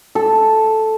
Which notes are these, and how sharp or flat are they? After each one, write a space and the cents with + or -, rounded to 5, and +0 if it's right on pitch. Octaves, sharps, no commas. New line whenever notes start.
A4 -5